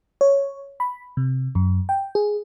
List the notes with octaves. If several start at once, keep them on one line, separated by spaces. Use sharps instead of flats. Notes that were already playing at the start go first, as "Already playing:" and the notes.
C#5
B5
C3
F#2
G5
G#4